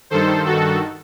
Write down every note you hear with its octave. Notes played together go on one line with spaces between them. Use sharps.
G2 D#3 A4 C5
F#4 A4